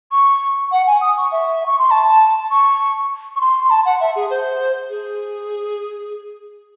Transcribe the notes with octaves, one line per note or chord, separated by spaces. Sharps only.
C#6
F#5
G#5
D#6
C#6
E5
C#6
C6
A5
C#6
C#6
C6
C6
A5
F#5
E5
G#4
C5
G#4